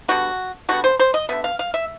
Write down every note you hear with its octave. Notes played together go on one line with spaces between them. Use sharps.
D3 G3 B3 F#4
D3 G3 B3 F#4
C5
C5
D#5
D3 G3 B3 E5
F5
F5
E5